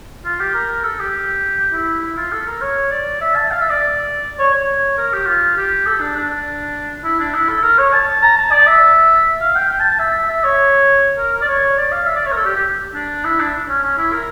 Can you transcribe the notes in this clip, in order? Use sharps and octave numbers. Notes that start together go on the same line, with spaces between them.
F4
G4
A#4
A4
G4
E4
E4
F4
A4
A#4
C#5
D5
E5
A5
F5
E5
D5
C#5
C#5
A#4
G4
F4
G4
A4
D4
D4
E4
D4
E4
A4
A#4
C#5
A5
A#5
A5
D5
E5
F5
G5
G5
A5
A5
E5
E5
C#5
A#4
A#4
D5
C#5
D5
F5
E5
D5
C#5
A#4
A4
G4
G4
D4
E4
D4
C#4
C#4
E4
A#4